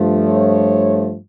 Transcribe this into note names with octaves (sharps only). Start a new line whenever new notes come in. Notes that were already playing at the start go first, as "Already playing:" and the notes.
Already playing: G2 F3 A3
C#5